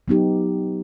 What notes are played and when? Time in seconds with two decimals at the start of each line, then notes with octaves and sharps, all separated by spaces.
0.08 F#3 B3 D#4 G4